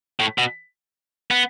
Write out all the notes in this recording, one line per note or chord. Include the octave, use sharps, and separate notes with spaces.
A2
B2
B3